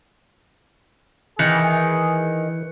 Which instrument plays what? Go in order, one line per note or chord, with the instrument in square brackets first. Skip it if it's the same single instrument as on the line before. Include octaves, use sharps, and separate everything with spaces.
[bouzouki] D#3 [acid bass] E3 [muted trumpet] G#4 [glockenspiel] F#6 C#7